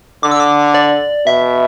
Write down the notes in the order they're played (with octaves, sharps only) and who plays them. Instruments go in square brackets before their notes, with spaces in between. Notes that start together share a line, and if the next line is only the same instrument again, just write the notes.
[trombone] D3 [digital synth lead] D6
[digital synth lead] E6
D6
D5
[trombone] B2 [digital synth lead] E5